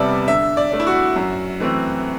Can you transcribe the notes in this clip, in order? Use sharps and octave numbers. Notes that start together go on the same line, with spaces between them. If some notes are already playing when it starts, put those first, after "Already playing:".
Already playing: E2 C3 G3 B3 D5 E5 A5
D3 E5
D5
A3 D4
E4
F#4
F#2
E3 A3 C4